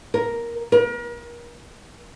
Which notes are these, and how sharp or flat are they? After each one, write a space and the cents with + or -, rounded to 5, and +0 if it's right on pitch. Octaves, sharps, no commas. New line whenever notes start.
A#4 +5
A#4 +40